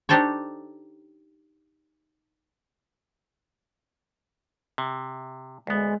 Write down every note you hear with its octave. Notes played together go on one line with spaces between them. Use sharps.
D4 D#4 G4 A4 C5 C#5
C3
D2 G#3 B3